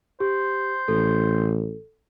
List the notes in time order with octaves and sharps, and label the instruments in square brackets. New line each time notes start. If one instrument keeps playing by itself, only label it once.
[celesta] G4 [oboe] C5
[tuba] A1 [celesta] A4